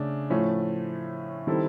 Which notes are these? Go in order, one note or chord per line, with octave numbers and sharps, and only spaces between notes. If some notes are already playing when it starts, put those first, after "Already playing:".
Already playing: C#3 A3 D4
A2 F3 A3 C#4
D#3 G3 C4 E4 A4